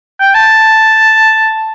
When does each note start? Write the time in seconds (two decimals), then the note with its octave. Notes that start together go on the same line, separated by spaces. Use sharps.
0.20 G5
0.34 A5